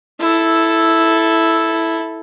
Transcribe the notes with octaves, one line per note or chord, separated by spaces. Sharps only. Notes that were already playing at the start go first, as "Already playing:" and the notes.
E4 A4